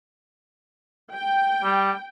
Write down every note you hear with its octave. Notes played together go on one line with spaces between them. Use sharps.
G5
G3